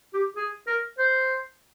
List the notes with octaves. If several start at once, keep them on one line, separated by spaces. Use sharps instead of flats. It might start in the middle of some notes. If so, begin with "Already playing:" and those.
G4
G#4
A#4
C5